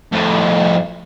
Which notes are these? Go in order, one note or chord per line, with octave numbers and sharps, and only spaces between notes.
F2 A2